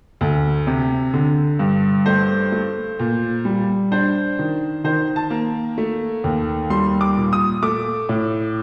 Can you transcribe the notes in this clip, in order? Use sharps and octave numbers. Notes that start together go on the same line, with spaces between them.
D2 A4
C3
D3
G2
A3 C5
A3
A#2
G3
D4 C5
D#3
D#3 C5
A5
A#3
A3
D#2
G3 C6
D6
A#2
D#6
A3 D6
A2